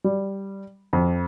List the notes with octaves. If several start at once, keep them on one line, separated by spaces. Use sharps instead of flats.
G3
F2